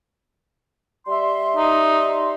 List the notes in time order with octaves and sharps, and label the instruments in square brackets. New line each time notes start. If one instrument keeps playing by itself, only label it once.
[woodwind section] G3 E5 C6
[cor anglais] D#4